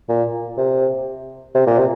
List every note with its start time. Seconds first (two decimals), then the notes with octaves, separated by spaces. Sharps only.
0.09 A#2
0.57 C3
1.55 C3
1.67 A#2
1.78 C3